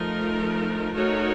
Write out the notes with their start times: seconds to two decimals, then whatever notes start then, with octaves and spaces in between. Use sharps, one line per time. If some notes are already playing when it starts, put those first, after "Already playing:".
Already playing: F3 A3 D#4 A#4
0.94 A3 D#4 F#4 A#4 C#5